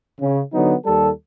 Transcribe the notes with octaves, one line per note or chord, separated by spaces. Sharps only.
C#3
D3 F#3 B3 D#4
D#2 G3 A4